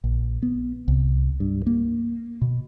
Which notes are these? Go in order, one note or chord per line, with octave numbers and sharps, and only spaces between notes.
A#1
B3
C2
G2
A#3
B2